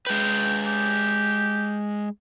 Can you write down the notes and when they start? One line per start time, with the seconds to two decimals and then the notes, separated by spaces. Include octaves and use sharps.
0.07 G#3 B4 G5
0.66 G4